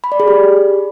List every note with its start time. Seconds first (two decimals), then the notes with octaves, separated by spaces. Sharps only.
0.04 B5
0.12 D5
0.20 G#4
0.28 G4